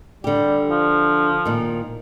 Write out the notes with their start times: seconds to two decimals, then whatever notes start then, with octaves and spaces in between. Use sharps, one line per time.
0.24 D3 G3 G4
0.70 F3
1.45 A#2 D#3